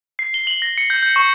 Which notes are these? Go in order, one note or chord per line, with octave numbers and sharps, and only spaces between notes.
C7
G7
F#7
A#6
C#7
G6
G6
C#6